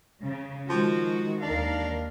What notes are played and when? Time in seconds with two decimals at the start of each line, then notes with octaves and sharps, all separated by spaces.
0.23 C#3
0.70 D#3 F3 G#3 F#4
1.43 D#2 D4 A#4 F5